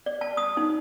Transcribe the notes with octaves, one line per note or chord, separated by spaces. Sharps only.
D5
A5
D#6
D#4